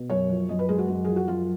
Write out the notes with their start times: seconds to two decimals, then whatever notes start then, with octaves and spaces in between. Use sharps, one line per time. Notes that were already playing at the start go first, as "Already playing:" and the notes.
Already playing: B2
0.10 F#2 C#5
0.30 F3
0.49 F#2 D#5
0.59 B4
0.69 G#3 G#4
0.78 F#4
0.88 F#2
1.04 F3 G#4
1.16 F#4
1.27 F#2 F4